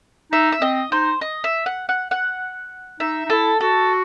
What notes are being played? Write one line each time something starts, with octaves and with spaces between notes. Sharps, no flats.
D#4 E5
E5
C4 D#5
D#4 C5
D#5
E5
F#5
F#5
F#5
D#4 E5
D#4
E4 A4
F#4 A4